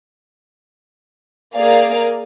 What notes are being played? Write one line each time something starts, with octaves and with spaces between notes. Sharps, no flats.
A#3 G#4 D5 F5